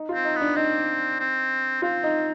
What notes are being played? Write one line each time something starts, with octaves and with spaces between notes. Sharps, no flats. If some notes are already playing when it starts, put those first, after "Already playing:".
Already playing: D#4
F4
C4
D#4
B3
D4
C4 D#4
C4
C4 F4
D#4